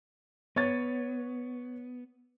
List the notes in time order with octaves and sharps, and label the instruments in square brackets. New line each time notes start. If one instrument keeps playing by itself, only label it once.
[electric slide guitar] B3 [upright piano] C#5 A6